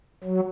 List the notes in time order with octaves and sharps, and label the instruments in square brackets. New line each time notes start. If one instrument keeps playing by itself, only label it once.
[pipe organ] F#3